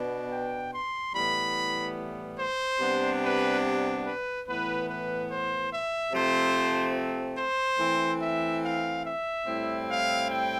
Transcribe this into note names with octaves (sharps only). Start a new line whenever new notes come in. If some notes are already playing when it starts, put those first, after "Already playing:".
Already playing: B2 B3 D4
G5
C6
A2 E3 G3 B3 B5
C5
C3 G3 B3 D4
B4
B4
A2 E3 B3 B4
B4
C5
E5
C3 F3 A3 C4 C5
C5
E3 A3 C4
E5
F5
E5
A2 G3 C4 E4
F5
G5